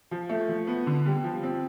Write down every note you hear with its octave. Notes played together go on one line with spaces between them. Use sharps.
F3
A3
F3
B3
D3
G3
F3
C4